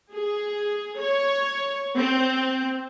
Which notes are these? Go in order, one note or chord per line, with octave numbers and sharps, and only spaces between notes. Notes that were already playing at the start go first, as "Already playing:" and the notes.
G#4
C#5
C4